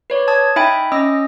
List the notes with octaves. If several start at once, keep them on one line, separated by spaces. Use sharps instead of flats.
B4 C#5 D5
A5 D#6 G#6
D#4 E5 G5 G#5 B5
C#4 D#5 D#6 E6 A#6